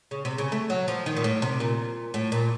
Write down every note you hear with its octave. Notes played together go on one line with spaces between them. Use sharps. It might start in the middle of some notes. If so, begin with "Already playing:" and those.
C#3
C3
C#3
A3
F#3
F3
D#3
A#2
A2
C3
A#2
A2
A#2